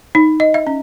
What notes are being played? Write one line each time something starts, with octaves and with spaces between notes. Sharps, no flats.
D#4
D#5
E5
C#4